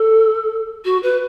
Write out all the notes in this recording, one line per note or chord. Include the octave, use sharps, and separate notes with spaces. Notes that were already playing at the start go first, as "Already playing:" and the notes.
Already playing: A4
F#4
B4